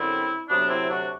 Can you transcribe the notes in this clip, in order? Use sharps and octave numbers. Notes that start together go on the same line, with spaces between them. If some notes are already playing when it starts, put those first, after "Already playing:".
Already playing: F#2 D3 G3 C4 E4
D2 C3 F#3 B3 D4
C4 E4
D4 F#4